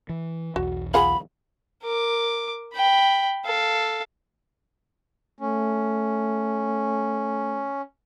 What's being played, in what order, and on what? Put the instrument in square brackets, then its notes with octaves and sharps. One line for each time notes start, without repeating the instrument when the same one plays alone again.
[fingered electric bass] E3
[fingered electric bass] B1 E2 [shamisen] F#4
[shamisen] F4 G#4 F#5 [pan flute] B5
[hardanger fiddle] A#4 D6
G5 B5
A4 F5
[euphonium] A3 [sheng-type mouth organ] C#4